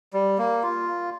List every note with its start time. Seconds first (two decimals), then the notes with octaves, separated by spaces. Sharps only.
0.13 G3
0.38 A#3
0.63 F4